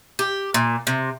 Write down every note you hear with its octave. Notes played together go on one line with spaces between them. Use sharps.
G4
A#2
C3